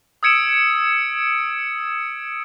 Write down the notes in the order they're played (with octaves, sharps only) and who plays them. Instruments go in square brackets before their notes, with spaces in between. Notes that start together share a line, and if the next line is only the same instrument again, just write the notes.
[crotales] D#6 E6 G#6 C#7 D7 E7